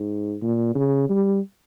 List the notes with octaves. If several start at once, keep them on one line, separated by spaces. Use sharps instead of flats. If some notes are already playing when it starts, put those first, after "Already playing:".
Already playing: G#2
A#2
C#3
G3